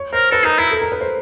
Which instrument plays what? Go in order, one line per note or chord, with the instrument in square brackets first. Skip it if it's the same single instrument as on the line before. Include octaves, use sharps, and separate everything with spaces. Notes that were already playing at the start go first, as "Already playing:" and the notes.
Already playing: [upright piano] C#5
[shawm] A#4 [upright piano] C5
[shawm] A4 [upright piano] B4
[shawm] D#4 [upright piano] A#4
[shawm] E4 [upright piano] A#4
[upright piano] A4
A#4
B4
C5